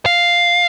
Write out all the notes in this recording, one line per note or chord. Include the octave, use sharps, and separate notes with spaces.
F5